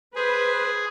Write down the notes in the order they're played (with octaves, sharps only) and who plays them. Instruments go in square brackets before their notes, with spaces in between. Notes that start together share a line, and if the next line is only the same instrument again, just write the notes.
[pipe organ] G#4 [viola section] B4 [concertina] C5